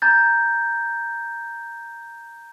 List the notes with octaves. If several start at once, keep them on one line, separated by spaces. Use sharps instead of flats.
A#5 G6 A6